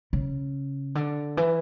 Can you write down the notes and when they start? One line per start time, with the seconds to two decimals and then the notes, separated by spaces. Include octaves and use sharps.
0.13 C#3
0.95 D3
1.37 E3